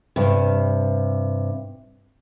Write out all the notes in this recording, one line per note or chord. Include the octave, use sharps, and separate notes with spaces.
G2 C3